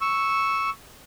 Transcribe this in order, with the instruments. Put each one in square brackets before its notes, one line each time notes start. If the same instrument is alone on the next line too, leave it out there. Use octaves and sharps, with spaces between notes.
[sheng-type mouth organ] C#6 E6